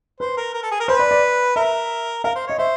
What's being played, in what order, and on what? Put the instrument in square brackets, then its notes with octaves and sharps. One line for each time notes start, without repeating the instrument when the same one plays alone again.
[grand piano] B4 [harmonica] C5
[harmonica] A#4
A#4
A4
G#4
A#4
[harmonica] B4 [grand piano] C5
[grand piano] D5
D5
[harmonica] A#4 [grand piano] E5
[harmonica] A#4 [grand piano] F5
[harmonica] C5
[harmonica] C#5 [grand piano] D#5
[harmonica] C5 [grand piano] E5